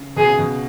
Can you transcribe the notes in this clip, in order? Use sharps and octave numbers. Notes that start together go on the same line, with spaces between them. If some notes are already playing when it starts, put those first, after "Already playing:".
Already playing: C#3
B2 G#4
C#3
B2